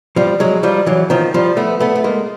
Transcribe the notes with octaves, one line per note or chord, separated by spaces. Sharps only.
F3 G3
F#3 G#3
F3 G3
E3 F#3
D#3 F3
F3 G3
A3 B3
A3 B3
A3
G#3 A#3